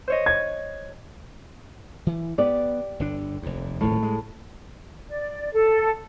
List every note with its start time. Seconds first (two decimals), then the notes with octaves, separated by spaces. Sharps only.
0.08 C5 C#5 D#5
0.26 G#6
2.07 E3
2.38 B3 G4 D5
3.00 G1 D3 D4
3.42 F1 D#2
3.81 D#1 G#1 A2 F3
4.03 G#3
5.09 D5
5.53 A4